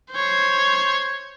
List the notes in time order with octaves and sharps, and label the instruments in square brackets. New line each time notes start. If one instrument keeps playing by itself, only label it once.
[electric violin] C5 C#5